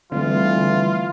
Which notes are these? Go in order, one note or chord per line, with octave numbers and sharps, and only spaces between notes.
D3 E3 G3 A3 C4 F4